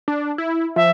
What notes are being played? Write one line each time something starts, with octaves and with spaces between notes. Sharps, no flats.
D4
E4
F3 E5